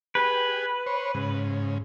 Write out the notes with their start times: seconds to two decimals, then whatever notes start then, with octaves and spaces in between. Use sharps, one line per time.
0.15 G4 G#4 B4
0.86 C5 C#5
1.15 G#2 C#3